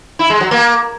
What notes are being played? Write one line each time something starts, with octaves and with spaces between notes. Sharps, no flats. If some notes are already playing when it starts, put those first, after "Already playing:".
E4
G#3
F#3
A#3